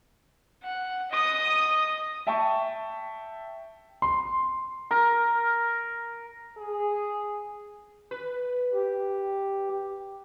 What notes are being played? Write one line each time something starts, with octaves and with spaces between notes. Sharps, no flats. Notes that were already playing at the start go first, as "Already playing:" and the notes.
F#5
D#5 D#6
E5 G5 A5 C#6
C6
A#4
G#4
B4
G4